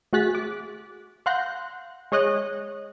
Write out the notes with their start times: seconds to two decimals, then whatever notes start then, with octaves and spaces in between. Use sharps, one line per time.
0.13 A3 F#4 G#4 F#6 A6 B6
0.35 D6
1.26 F5 F#5 C6 F#6 G6 A#6
2.12 G#3 C#5 D#5 F#6